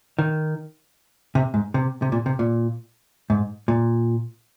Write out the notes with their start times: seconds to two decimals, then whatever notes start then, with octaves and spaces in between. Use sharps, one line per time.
0.19 D#3
1.35 C3
1.54 G#2
1.74 C3
2.02 C3
2.12 A#2
2.26 C3
2.39 A#2
3.30 G#2
3.68 A#2